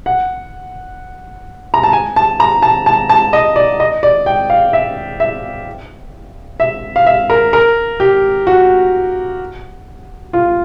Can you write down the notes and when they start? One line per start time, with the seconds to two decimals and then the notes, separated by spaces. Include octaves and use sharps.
0.06 F#5
1.74 A#5
1.83 A5
1.93 G#5
2.16 A5
2.40 A#5
2.62 A5
2.86 A5
3.10 A5
3.33 D#5
3.56 D5
3.80 D#5
4.03 D5
4.26 G5
4.50 F5
4.73 E5
5.20 E5
6.60 E5
6.96 F5
7.06 E5
7.30 A#4
7.53 A#4
8.00 G4
8.47 F#4
10.33 F4